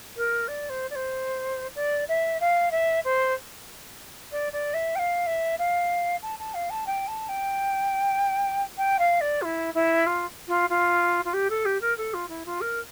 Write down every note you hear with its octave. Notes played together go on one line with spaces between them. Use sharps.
A#4
D5
C5
D5
C5
D5
E5
F5
E5
C5
D5
D5
E5
G5
F5
E5
F5
A5
A5
F5
A5
G5
A5
G5
G5
F5
D5
F4
E4
E4
F4
F4
F4
F4
G4
A4
G4
A#4
A4
F4
E4
F4
A#4